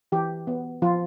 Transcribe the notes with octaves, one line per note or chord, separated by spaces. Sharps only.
E3 G4
B3
F3 F4